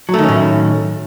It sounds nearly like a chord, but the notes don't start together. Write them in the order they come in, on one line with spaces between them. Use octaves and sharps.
F#3 A3 D#3 C#4 A2